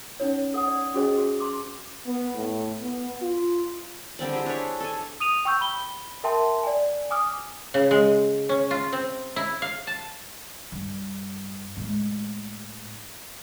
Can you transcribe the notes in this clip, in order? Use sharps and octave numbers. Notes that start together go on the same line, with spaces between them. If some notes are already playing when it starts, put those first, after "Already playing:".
C#4 D#4 C#5
A4 F#5 D#6
D5
C#4 F#4 G#4 C5 D#5 G#5
F#4
A5 C6 D6
B3
A2
B3
F4
D3 G3 C4 D5
E4 G4 G#4
D4 C#5
A4 G#5
D#6 D#7 F7
G5 C#6 E6 G6
B5 G7
A#4 E5 G5 A5 C6
D5 G#5
G#5 D6 D#6 F6
C#3
G#3
C#4
F4
C4
E4
F5
A5
G2
A2 G#3